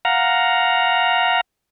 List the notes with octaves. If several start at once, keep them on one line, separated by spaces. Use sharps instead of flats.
F5 F#5 A#5